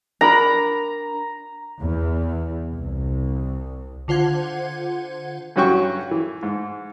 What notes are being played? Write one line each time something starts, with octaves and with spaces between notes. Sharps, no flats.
D4 A#4 A#5 B5
E2
C2
D3 F4 C5 F#5 G#6
G2 F#3 C#4 F#4 G5 C#6
E3
G#2